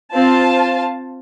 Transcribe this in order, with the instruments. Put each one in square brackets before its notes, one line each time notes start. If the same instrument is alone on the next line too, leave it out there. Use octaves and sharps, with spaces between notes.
[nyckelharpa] C4 [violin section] F4 C5 F5 A5